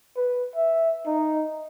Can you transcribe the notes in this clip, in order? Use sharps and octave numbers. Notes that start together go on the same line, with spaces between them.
B4
E5
D#4